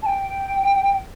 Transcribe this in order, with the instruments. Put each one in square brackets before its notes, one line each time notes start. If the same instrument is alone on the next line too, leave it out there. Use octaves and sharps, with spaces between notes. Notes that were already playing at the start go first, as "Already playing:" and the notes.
[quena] A5
G5